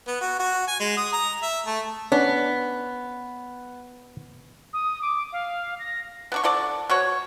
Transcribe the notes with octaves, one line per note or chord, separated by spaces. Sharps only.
B3
F#4
F#4
G#5
G#3
D#6
A#5
E5
A3
B3 C#4 D4
D#6
D6
F5
A#6
B3 D4 C#6
D3 A4 D5 A5
B2 F#4 C#5